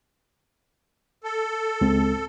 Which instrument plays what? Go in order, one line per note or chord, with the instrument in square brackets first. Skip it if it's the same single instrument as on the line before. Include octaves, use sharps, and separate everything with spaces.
[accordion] A4
[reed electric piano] C#2 G#3 C4